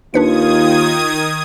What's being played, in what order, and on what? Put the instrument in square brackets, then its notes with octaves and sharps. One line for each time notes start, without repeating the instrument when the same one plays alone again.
[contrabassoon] D#2 [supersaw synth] D#3 D#6 G#6 [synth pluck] D4 B4 C#7 [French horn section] F4